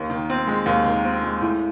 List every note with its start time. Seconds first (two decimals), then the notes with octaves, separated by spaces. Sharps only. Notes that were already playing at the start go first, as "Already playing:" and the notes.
Already playing: D#2
0.10 D#3
0.30 C4
0.47 G#3
0.66 D#2
0.85 D#3
1.05 C4
1.23 G#3
1.41 A2